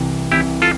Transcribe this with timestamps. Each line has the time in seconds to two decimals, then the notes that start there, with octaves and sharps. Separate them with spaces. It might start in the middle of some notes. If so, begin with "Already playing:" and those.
Already playing: C2 C3 E3
0.32 C2 C3 E3 E4 G4
0.62 F4 A4